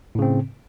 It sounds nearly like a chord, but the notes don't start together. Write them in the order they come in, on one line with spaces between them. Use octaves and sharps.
A2 C#3 C4